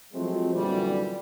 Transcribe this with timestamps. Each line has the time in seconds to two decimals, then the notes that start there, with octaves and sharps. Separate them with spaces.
0.14 F3 F#3 G#3 A3 C4
0.55 F#2 A#2 D3 E3 G3